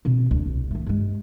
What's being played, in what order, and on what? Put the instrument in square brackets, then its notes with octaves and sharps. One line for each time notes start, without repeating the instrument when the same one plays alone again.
[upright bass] B2 C4
D2
C2
D#3 A3
G2 G#3